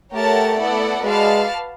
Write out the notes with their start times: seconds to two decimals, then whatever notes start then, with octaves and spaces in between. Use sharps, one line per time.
0.12 A3 G4 A#4 C#5 F#5 A5
0.58 B3 E4 A4 D5 F#5
1.03 G#3 F#4 B4 D5 F5 A5